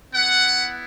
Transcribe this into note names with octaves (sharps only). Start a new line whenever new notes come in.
B3 E4 F#5